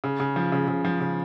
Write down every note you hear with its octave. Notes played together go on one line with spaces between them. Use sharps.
C#3
C#3
F3
C#3
C#3
F3
C#3